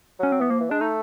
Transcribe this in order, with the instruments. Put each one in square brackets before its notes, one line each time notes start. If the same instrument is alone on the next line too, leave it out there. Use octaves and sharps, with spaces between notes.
[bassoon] F#3 [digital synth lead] C#4
[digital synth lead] C4
[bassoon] E3 [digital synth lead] B3
[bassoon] F3 [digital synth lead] A#3
[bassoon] E3
[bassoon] G#3 [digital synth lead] D4
[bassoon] A3 [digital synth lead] D#4